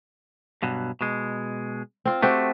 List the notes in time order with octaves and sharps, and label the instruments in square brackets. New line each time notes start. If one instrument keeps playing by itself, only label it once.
[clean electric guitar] G2 B2 F#3
B2 G#3
[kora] C4 F4
[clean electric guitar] A3 [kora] C4 F#4 G4